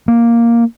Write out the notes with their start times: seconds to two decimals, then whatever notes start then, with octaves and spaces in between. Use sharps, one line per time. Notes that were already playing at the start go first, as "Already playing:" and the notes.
0.08 A#3